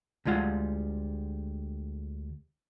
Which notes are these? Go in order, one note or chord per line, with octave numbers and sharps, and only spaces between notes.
D2 G3 G#3 F4 F#5